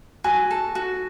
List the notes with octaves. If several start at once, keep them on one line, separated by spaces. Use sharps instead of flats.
F#4 G#5
A4
F#4